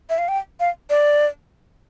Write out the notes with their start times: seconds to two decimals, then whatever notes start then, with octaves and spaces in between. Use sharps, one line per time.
0.10 E5
0.18 F5
0.28 G5
0.60 F5
0.90 D5